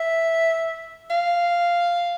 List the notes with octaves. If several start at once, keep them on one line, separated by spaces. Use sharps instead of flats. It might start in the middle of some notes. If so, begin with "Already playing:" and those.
Already playing: E5
F5